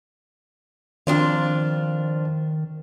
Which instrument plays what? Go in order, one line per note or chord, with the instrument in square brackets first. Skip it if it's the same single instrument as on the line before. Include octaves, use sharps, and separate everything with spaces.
[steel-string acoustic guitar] F2 D4 F4 [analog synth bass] D#3